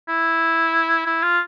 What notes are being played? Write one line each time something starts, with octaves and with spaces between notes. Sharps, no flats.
E4
E4
F4